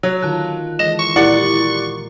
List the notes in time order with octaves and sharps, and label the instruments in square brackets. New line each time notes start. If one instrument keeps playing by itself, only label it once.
[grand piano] F#3
[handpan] D3 D#3 F4 [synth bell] A5 F#6
[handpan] E3 G#3 [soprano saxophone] D#5 [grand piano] E7
[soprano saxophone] C#6
[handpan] A#2 A#4 [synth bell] E4 G4 [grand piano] D5 F#5 C#7